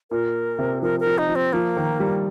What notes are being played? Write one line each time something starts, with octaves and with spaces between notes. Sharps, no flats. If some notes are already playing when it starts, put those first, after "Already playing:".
A#2 A#4
C3
F3 A#4
A#4
F3
D#4
F3
C4
F3 A#3
D#3
G3